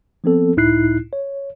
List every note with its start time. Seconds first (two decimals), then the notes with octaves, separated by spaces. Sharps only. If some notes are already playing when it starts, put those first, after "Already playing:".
0.24 F3 B3 C4 A4
0.57 C#2 A2 D#4 E4 F#6 C7
1.13 C#5